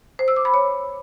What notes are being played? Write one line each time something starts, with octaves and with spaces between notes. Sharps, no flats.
C5
E6
D6
B5
C#5